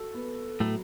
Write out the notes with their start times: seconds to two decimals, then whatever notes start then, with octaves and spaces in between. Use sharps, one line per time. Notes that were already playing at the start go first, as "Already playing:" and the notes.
Already playing: F#4 A4
0.14 B3
0.60 A2 F#3 A3